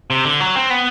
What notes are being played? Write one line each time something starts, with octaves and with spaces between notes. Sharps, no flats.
C3
D3
F#3
C4
B3